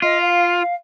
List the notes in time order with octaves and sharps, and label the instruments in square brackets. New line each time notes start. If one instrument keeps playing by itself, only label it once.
[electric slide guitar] F4 [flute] D#5
[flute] F5